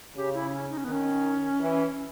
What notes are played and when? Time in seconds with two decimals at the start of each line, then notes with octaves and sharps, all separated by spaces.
0.16 C#3 G4
0.34 E4
0.52 C#4
0.70 D#4
0.77 C#4
0.84 B3
0.88 D#3 C#4
1.60 E3